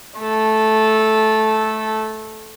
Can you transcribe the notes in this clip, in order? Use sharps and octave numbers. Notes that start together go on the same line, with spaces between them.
A3 A4